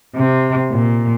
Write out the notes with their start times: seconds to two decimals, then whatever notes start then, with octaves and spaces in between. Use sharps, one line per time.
0.15 C3
0.72 A#2